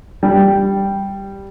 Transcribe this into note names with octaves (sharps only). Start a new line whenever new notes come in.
G3